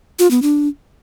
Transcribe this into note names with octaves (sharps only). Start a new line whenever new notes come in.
F4
B3
D4